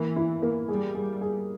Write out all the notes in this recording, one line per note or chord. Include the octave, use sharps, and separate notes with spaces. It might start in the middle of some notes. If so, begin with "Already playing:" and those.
Already playing: E3 A#3
E4
A#3
G3 G#4
G#4
G#4